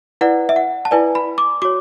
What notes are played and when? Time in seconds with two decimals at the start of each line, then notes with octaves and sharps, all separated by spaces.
0.21 E4 B4 D5 F#5
0.49 E5
0.56 F#5
0.85 A5
0.91 E4 B4 D5 G#5
1.15 B5
1.38 D6
1.62 F#4 C#5 D6